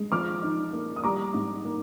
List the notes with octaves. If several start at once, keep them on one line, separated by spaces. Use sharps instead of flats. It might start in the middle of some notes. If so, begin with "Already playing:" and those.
Already playing: G#3
F3 D6 F6
D#4
A#3
D#6
G3 A#5 D6
G#2
A#3